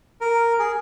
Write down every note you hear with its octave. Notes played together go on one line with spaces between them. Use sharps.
A#4
G#4